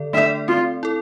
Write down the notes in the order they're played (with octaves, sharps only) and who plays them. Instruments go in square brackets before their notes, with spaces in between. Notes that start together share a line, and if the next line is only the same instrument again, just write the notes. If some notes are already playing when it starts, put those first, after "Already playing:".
Already playing: [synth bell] D3 A4 D5
[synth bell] A3 D4 A4 D5 [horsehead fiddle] E5
[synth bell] C4 [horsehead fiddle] F4
[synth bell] E4 A4